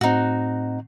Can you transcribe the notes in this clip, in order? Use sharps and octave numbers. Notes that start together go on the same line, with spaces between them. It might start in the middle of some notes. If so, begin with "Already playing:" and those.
A2 C4 D#4 F#4